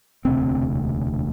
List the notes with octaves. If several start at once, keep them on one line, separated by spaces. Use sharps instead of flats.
E1 D2 C3 C4